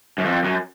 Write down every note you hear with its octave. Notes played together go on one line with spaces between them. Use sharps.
F#2
F2
F#2